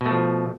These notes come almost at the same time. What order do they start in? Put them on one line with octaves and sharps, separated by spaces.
B2 A3 F3